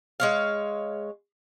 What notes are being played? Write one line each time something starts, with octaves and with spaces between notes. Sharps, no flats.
G#3 C#5 F5